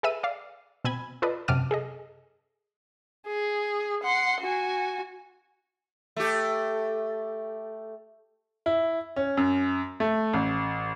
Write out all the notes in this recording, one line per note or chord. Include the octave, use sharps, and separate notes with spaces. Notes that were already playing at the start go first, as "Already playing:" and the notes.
G#4 A4 B4 E5 E6 D#7
D5 F5
B2 C4 G#5 B5 G#6
F4 A4 B4 D5 D#5
F#2 C3 A5 D6 F6 D#7
G#4 A4 D#5
G#4
F#5 C6
F#4 G#5
A3 G4
E4
C#4
F#2
A3
A1